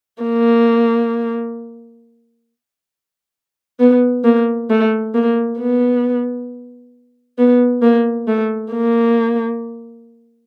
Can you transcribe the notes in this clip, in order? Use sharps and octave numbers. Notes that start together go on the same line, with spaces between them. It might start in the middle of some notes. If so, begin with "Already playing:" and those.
A#3
B3
A#3
A3
A#3
B3
B3
A#3
A3
A#3